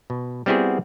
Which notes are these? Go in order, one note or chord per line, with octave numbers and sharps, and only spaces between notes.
B2
G3 B3 C4 E4 F#4 G#4